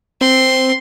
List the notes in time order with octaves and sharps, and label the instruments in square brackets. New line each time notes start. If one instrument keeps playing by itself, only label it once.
[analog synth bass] C4 [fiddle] C6